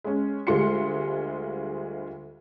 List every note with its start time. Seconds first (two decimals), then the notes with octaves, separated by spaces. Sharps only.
0.04 G#3 C#4
0.47 D2 G3 G#3 F4 C6 C#7